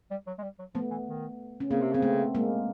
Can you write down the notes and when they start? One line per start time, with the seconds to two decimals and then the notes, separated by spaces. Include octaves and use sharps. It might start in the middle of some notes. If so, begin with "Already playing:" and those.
0.11 G3
0.27 F#3
0.38 G#3
0.43 G3
0.59 F#3
0.75 F3 A3 B3
0.91 E3
1.07 D#3
1.60 C#4
1.71 C#3 A#3 C4
1.82 C3
1.93 C#3 C4
2.02 A3 B3
2.35 G#3 A#3